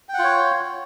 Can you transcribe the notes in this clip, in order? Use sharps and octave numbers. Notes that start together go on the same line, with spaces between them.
F4 C#5 F#5 G5